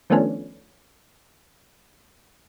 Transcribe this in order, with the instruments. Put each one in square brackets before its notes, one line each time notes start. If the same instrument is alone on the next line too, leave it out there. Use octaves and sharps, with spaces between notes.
[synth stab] D#3 F3 A3 B3 C#4 D4